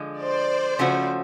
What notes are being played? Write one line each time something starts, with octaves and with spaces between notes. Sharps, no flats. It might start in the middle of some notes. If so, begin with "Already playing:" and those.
Already playing: D3 F3 G#3
C5 D5
C#3 F3 A3 C#4 F#4